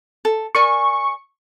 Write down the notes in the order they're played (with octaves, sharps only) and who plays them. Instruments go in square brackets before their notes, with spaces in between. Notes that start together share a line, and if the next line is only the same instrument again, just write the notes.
[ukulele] A4
[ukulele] A#4 D5 G#5 [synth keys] C#6